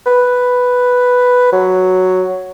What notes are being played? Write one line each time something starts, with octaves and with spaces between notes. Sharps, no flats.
B4
F#3